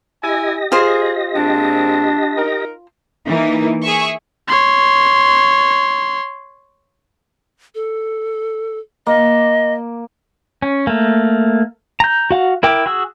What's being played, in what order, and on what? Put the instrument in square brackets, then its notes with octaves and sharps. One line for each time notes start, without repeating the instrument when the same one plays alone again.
[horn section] E4 G#5 [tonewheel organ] G4 D#5 A#6
[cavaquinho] F4 C5 [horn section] G#4
[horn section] A#2 G#3 C4 [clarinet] D4
[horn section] D#4 A#4
[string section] E3 A#3 D#4
G#4 E5 C#6
[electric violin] C#5 C6
[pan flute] A4
[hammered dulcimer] A#3 [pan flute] D#5
[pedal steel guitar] C#4
A3 A#3
A#5 G6
F#4 F5 F#5
E4 A#4 G5 D6
F#4 G#4 E6